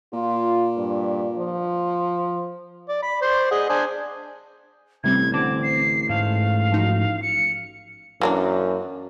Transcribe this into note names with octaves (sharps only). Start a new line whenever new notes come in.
A#2 F4
G2
F3
D5
B5
C5 D5 C6
G#4 D#5 F#5
D4 C5 G#5
A1 C3 G3 C4 G#6
D3 C4 D6
C7
G#2 A3 F5
F3 D#4 F#4
C#7
F#2 E3 A#3 D4